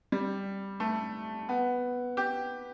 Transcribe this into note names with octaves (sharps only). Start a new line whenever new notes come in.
G3
A3
B3
G4